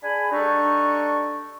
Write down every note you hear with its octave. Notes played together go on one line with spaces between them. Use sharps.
D4 G#4 G#5 B5
G3 D4 D#4 A4 C#6